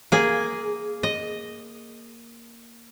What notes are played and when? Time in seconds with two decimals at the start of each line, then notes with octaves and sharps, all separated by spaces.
0.12 A#3 G#4
1.03 D#5